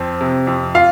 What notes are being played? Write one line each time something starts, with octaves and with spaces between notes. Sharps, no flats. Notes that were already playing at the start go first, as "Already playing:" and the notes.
Already playing: F2 C4
C3
F2
F4 F5